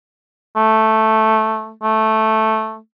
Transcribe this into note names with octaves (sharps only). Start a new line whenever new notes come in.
A3
A3